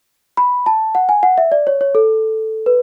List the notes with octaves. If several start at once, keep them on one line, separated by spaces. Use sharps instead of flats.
B5
A5
F#5
G#5
F#5
E5
D5
C#5
C#5
A4
B4